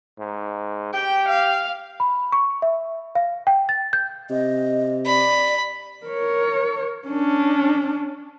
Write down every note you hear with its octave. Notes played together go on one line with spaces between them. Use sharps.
G#2
G4 G5
F5
B5
C#6
E5
F5
G5
A6
G6
C3 D#5
D5 B5
A#4 C#5
C#4 D4